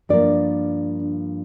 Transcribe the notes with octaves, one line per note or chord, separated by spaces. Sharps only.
G2 F3 A#3 D4 D5